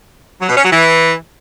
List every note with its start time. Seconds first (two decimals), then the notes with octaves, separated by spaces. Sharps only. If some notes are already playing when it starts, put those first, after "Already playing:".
0.40 F#3
0.48 B2
0.56 C#4
0.64 F#3
0.72 E3